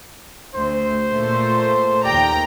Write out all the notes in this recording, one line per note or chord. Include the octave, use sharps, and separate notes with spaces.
D2 C5
A#2 A3
D#2 G4 D5 G5 A#5